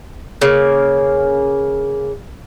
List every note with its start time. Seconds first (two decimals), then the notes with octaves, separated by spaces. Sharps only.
0.42 C#3 A#3